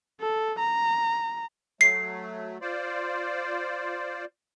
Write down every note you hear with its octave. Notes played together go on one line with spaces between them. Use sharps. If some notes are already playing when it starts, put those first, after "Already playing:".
A4
A#5
F#3 A3 C7
F4 C5 D5